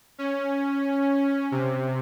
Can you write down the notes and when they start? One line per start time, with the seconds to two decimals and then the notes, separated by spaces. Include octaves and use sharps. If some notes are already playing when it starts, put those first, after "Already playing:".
0.18 C#4
1.52 C3